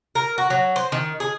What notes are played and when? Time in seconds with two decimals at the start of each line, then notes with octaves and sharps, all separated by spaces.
0.15 A#4
0.38 F#4
0.50 F#3
0.76 C5
0.92 D#3
1.20 G#4